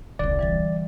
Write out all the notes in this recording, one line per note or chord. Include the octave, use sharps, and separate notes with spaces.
D#1 C2 D3 D5
E3 G3 A6